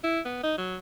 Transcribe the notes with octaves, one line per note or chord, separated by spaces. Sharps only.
E4
B3
D#4
F#3